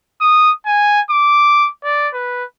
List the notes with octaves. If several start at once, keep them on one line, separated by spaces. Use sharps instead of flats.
D#6
G#5
D6
D5
B4